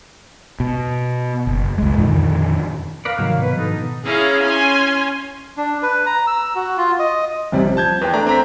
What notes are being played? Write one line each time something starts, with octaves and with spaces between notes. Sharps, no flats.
B2
F#1
C#2 G#3
F2 A#2 D3 D#3
A#4 B4 D5 F5
G#2 C3 D#3 F3 F#3 A#3
B2 B4
G#2 D#3 F3 D4 D#4 A4
C#4 E4 G#4 F5 A#5
C#4 G#5 C6
D4
B4
A#5
E6
F#4
F4
D#5
A1 C3 G3
F3
A5 G6 G#6
E2 B4 G5
A3 D4 D5 A#5
C4 A#5 B6